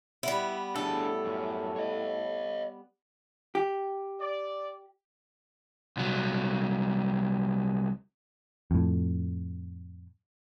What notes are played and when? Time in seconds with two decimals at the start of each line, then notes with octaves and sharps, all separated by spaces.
0.23 G3 B3 E4 B4
0.76 A2 D4 G#4 A4
1.25 F#2
1.76 C#5 D#5
3.55 G4
4.21 D5
5.97 C2 F#3
8.71 F2 A2